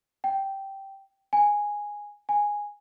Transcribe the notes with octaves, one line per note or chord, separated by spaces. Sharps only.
G5
G#5
G#5